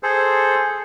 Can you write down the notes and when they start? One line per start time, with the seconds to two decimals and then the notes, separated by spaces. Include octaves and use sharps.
0.03 G#4 A4 C5